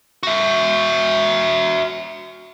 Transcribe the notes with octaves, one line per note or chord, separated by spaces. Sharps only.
F#4 E5